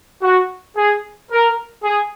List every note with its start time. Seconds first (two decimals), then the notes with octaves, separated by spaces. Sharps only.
0.22 F#4
0.76 G#4
1.30 A#4
1.84 G#4